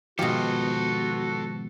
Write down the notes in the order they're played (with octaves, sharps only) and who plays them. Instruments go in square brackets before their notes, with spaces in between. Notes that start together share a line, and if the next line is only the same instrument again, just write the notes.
[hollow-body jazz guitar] G#2 D#3 F3 [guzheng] B2 G4 [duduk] F#4 [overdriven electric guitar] A4 C5